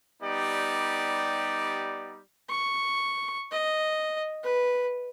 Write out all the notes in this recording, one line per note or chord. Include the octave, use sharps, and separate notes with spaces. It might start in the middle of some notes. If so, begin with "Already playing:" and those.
G3 B3 D#4 G4 D5
C#6
D#5
B4